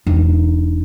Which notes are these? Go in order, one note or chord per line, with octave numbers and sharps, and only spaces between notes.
E1 D#4